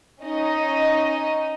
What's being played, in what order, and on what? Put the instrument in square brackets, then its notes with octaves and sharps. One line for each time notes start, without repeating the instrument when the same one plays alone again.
[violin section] C#4 D#4 D#5